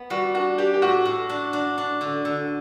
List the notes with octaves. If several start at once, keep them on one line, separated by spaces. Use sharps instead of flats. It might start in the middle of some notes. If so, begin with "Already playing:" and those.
Already playing: B3
G3 F#4
D4 F#4
D4 G4
G4
A2 F#4
A2
D4
D4
D4
D3
D3